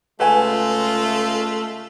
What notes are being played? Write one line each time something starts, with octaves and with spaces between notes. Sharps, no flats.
C#2 G#3 A3 F4 B4 G#5